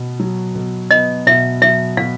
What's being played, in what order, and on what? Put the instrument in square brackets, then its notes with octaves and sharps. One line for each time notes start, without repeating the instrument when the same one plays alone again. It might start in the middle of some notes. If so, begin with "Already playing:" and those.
Already playing: [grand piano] B2 B3
F#3
B2
[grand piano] B3 [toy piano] D#5
[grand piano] B2 [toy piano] E5
[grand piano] F#3 [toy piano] E5
[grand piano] B2 [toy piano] F5